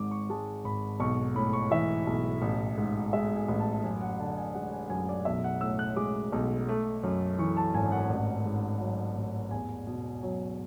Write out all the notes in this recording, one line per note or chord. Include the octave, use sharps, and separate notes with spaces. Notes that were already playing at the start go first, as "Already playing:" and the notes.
Already playing: G#1 G#2 D6
C#6
G#3 A5
G#1 B5
B1 C#6
A2 B5
C#6
E3 E5
B1
A1
G#2
G#3 E5
G#5
A1
A5
A5
F#2 G#5
F#5
D3 A5
G#5
G#3 F#5
G#5
F#2 G#5
D5
B1 E5
F#5
A2 E6
F#6
G#3 D6
B1
A3
F#2
E3 C#6
A5
G#1 G#5
F#5
A1
G#2
F#3
A1
E2 G#5
B2
F#3